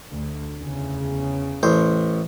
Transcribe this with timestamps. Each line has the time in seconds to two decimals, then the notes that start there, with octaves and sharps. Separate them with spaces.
0.11 D2
0.56 E2 C#3
1.63 A1 C5